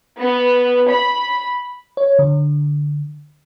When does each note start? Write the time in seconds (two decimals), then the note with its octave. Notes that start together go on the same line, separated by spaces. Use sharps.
0.19 B3
0.90 B5
1.97 C#5
2.19 D3